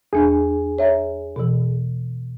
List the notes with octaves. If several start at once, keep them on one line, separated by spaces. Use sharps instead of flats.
E2 D4 G#4 G#5
C#5 E5 A#5
B2 E3